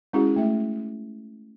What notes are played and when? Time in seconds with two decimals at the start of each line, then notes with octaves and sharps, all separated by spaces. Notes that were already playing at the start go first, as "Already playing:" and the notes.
0.13 G#3 C#4 E4 F#4 G#4
0.36 A3 E5